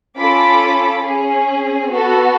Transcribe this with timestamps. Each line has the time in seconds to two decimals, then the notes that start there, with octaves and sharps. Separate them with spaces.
0.16 C#4 F4 A4 B5 D6
1.04 C#4 G#4
1.91 B3 F#4 A4